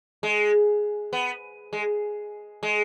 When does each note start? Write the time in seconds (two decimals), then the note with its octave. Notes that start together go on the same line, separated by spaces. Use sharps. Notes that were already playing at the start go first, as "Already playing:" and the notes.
0.23 G#3
1.13 B3
1.73 G#3
2.63 G#3